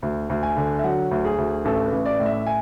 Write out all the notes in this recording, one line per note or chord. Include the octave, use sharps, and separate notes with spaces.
D2
D2
G#5
D3
E5
F#3 F#5
D2
G#4
D2
A1 A4
B4
A1
D5
A2
E5
G#5